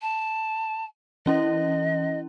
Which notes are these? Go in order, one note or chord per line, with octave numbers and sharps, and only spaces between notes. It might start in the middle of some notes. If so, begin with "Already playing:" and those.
A5
E3 C#4 E4 D#5